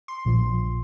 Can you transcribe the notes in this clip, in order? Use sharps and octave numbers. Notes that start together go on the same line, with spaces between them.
C6
A#1 A#2 F3